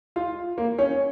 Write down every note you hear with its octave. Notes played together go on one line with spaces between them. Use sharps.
F4
A#3
C#4